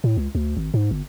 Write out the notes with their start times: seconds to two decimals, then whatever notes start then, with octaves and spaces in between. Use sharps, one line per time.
0.04 A2
0.17 C#2
0.35 D2
0.57 G#1
0.74 G#2
0.91 G1